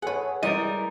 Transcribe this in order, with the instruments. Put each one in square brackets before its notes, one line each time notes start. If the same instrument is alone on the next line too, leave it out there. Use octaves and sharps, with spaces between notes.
[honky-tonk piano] G#4 A4 C#5 [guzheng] B4 F#5
[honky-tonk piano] E3 D5 [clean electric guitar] G3 A#4 [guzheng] G#3 [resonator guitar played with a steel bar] D#5